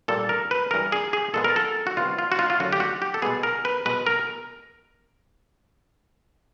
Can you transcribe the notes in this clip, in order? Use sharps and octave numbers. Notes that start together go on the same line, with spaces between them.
A#2 G3 A#3 A4
A#4
B4
G2 E3 G#3 A#4
G#4
G#4
A#2 F3 G#3 B3 A4
A#4
A4
F#4
C3 D#3 G3 B3 F4
F4
F#4
F4
F4
F#2 D3 F#3 F#4
G4
F#4
G4
A4
B2 G#3 B3 G#4
A#4
B4
B2 G#3 B3 B4
A#4